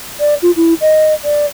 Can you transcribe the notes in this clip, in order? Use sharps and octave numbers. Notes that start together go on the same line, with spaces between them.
D5
F4
E4
D#5
D5